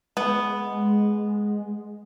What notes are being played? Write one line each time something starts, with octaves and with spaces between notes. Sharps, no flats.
G#3 B3